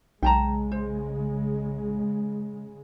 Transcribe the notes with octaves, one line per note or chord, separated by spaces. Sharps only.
B1 C#3 G#3 G5 A5 A#5
C5